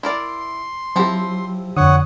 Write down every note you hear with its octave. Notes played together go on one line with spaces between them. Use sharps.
E4 A#4 D5 C6
F3 F#3 C4 E4 G4
F2 D3 C#5 F#5 D#6